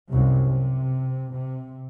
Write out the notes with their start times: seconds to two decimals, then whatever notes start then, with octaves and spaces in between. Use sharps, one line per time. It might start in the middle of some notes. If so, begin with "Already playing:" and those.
0.12 C2 F#2 C3
0.47 C3
1.34 C3